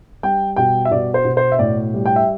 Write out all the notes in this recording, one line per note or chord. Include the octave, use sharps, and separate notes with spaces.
G3 G5
B2 G5
E5
B2 D5
C5
B2
C5
E5
A2 D5
G3
G5
E5